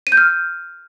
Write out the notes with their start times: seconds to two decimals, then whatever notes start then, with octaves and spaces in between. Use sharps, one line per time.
0.07 D#7
0.12 G6
0.17 F6